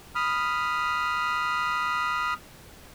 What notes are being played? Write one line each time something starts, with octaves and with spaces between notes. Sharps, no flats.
B5 D#6 F6